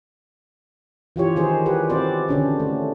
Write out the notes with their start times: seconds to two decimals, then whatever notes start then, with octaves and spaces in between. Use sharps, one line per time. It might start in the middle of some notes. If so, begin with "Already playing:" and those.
1.16 E3 F4 G4 C#5
1.36 D#3 D#4 G#4 C5
1.66 G4 B4
1.90 C4 F#4 C5 D5
2.28 D3 C#4 D4
2.60 A3